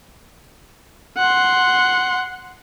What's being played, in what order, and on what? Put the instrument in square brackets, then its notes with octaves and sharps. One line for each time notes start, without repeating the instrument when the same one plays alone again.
[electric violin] F#5 C6